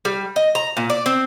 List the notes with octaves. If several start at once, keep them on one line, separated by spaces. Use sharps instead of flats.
G3
D#5
A#5
A#2
D5
C4